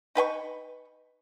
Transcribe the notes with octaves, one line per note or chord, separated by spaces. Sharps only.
D#4 B4 G5 C#6